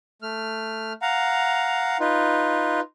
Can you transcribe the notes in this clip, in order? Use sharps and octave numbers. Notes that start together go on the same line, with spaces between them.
A3 F6
F5 F#5 A#5
D#4 F4 B4